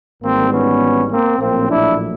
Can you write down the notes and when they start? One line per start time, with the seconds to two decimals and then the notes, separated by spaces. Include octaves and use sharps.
0.21 G#1 G#2 E3 G3 A#3 C4
0.51 B3 C#4
1.09 A#3 C4
1.39 A#1 A2 F#3 A#3 C4
1.68 D4 E4